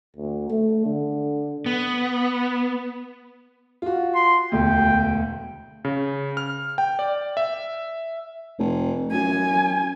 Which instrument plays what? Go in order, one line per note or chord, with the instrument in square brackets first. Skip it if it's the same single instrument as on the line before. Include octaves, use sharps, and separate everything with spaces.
[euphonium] D2
A3
D3
[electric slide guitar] B3
[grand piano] F4 F#4
[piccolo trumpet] C6
[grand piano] E1 D2 [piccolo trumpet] G5
[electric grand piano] C#3
F6
G5
D5
E5
[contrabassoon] F1
[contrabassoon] F#2 [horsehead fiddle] G#5